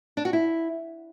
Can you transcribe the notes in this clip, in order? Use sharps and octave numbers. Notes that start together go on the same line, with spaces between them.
D4
F#4
E4